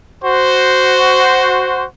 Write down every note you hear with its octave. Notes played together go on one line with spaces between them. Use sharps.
F#4 C5